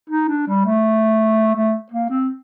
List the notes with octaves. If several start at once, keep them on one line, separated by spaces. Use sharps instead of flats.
D#4
D4
G3
A3
A3
A#3
C4